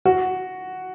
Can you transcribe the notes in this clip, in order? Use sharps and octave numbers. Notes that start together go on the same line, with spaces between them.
F#4